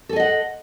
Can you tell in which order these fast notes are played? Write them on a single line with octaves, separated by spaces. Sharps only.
A4 G#5 D#5 F#5